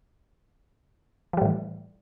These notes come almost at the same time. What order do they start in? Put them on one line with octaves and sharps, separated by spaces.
F3 G3 A2 E3